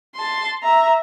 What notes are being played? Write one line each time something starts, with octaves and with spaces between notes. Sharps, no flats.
A5 C6
E5 A#5